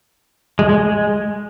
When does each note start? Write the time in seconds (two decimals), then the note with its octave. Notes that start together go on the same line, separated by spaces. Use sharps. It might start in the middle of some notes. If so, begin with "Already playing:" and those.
0.59 G#3
0.69 G#3
0.79 G#3